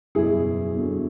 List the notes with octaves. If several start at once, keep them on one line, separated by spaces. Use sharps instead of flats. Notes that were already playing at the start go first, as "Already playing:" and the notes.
F#1 E2 B2 E4 G#4
E2 D3 F#3